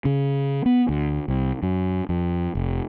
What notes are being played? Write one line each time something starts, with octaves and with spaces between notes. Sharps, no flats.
C#3
B3
D2
C2
F#2
F2
F1